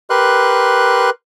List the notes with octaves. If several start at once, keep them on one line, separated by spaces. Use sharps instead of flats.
G4 A#4 B4 C6 F#6